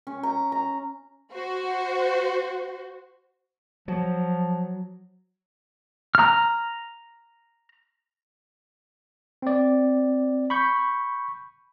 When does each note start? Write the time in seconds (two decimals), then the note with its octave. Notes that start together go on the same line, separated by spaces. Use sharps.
0.07 C#4
0.23 A#5
0.52 A#5
1.32 F#4 C5
3.88 F3 F#3
6.15 A#5 F6
9.42 C4 D5
10.50 B5 C#6 G6